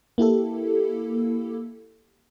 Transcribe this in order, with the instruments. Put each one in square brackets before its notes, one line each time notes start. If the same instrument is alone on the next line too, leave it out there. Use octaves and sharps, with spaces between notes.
[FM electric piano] A#3 E4 G4 A4